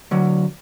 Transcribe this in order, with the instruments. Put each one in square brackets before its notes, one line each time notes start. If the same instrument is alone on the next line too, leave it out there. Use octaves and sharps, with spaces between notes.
[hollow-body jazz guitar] D3 F#3